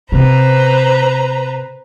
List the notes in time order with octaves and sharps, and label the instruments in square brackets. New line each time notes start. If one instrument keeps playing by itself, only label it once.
[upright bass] C3 [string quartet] B4 C5 A#5